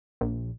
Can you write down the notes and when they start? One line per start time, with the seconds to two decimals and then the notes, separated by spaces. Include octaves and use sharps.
0.21 A#1